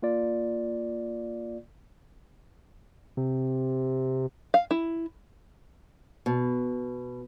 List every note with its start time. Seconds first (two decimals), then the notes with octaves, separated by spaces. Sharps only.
0.02 A#3 F4 D5
3.17 C3
4.54 F5
4.71 E4
6.26 B2